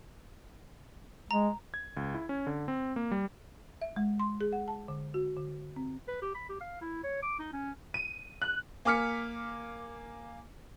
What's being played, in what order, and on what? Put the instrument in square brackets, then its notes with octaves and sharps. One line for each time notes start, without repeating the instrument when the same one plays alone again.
[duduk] G#3 [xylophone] A#5
[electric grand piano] G#6
C#2
E4
C#4
D3
C4
A#3
G3
[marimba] E5
G#3
C6
G#4
F#5
A5
D3
F#4
D3
C4
[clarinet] B4
G4
B5
G4
F5
E4
C#5
D6
D#4
C#4
[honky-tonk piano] D#7
F#6
A#3 G#5 D6 F6 B6 C#7